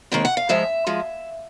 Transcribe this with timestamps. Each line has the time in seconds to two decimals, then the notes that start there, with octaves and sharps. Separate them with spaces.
0.12 D#2 D#3 G#3 C4 G5
0.25 F#5
0.37 F5
0.49 G#2 F3 G#3 E5
0.87 F3 G#3